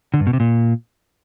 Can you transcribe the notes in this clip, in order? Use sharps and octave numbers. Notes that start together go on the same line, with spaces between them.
D3
G2
B2
C3
A#2